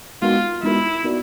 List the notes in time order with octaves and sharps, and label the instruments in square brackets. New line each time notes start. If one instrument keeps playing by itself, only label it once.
[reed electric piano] G#3 B3 D#4 F#4 A#4 [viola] F4
[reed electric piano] G#3 B3 D#4 F#4 A#4 [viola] E4
[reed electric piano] B3 D#4 F#4 A#4 D5